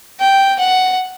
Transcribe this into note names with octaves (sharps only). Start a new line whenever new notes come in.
G5
F#5